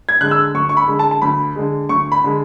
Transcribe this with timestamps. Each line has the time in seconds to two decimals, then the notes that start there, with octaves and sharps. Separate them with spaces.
0.09 G#6
0.21 D3 G#3 F#6
0.31 E6
0.54 D2 C#6
0.69 C#6
0.77 B5
0.88 D3 G#3
0.99 A5
1.11 A5
1.22 D2 B5
1.56 D3 G#3
1.89 D2 C#6
2.12 B5
2.24 D3 G#3